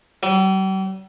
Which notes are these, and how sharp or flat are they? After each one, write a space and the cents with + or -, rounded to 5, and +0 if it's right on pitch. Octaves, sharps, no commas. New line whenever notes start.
G3 -45